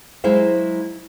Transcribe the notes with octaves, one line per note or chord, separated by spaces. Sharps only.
F#3 G#3 E4 C5 F5